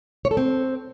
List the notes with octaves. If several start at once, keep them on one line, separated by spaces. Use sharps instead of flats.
C#5
A4
C4